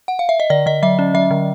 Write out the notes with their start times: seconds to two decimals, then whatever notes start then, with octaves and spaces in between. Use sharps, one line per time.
0.08 F#5
0.19 F5
0.29 E5
0.40 D#5
0.50 D3 D5
0.66 D3 D#5
0.83 F#3 E5
0.99 C#4
1.14 F#3 E5
1.31 D3